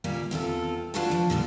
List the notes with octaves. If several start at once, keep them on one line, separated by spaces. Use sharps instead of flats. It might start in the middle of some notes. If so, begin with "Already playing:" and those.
D2 A#2 G3 A#3 C#4
E2 C4 F4 A4
D4 F4 F#4 B4 C#5 A5
F3 D4
A#2 D3 G3